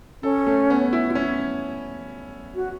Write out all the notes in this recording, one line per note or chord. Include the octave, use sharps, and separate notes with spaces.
C#4 A4
A3
B3
E4
E4
C#4
F#4